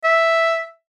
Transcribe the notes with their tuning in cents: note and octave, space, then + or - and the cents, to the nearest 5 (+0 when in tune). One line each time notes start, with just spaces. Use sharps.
E5 +0